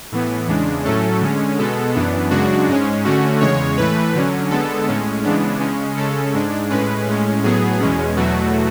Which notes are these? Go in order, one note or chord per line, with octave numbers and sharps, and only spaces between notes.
A2 E3 B3
E2 C#3 G#3 D4
A2 F#3 A3 C#4 A4
D3 G#3 C#4
B2 G#3 B3 A4
F#2 E3 B3 D4
F#2 C#3 G#3 D4 F#4
G#2 G#3 C#4
D3 A3 C#4 F#4
E2 C#3 G#3 C#5
A2 E3 A3 B4
D3 F#3 C#4
D3 G#3 B3 A4
A2 G#3 C#4
C#3 E3 G#3 B3 D4
C#3 G#3 C#4
C#3 G#3 C#4 A4
G#2 G#3 D4
A2 G#3 C#4 B4
A2 G#3 C#4
A2 F#3 B3 G#4
E2 B2 G#3 C#4
E2 B2 F#3 A3 F#4